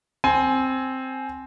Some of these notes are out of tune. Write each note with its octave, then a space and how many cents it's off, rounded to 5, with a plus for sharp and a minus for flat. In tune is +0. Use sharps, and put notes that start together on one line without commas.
C4 +0 G#5 +20